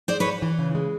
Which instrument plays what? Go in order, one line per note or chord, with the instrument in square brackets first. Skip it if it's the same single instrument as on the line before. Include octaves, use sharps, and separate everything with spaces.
[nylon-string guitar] G#3 [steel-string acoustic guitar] C5 D5
[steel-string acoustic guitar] B4 C#5
[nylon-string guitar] G#2
E3
C#3
G#3